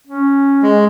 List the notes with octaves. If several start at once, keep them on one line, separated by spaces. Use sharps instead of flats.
C#4
G#3